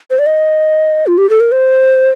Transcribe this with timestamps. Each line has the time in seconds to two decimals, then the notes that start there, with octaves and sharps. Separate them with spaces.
0.10 C5
0.19 D5
0.26 D#5
1.07 F4
1.18 G4
1.30 A4
1.40 A#4
1.52 C5